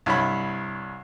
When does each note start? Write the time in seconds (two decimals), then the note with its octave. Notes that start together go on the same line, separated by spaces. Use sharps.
0.06 C2 G2 C#5 B5